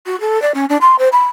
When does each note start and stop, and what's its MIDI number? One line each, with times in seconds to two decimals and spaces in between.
0.06 0.19 66
0.20 0.41 69
0.42 0.52 74
0.54 0.65 61
0.69 0.77 62
0.81 0.96 84
0.98 1.08 72
1.12 1.23 83